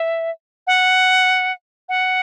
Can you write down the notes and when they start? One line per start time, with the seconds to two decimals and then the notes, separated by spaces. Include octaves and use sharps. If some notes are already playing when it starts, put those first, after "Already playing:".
Already playing: E5
0.67 F#5
1.89 F#5